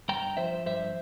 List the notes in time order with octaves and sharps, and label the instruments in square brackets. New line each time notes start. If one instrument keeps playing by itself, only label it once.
[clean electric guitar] G2 G5 A#5
F3 C5 E5
G2 C5 E5